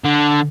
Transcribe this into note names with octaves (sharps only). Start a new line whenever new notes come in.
D3